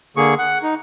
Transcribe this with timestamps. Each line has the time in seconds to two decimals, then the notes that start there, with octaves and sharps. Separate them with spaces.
0.17 D3 A#3 G#4 C#6
0.38 F#5
0.63 D#4